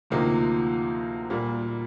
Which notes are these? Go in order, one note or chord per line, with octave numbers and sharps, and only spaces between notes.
D2 C3 F3 A#3 D#4
A#2 G3 A#3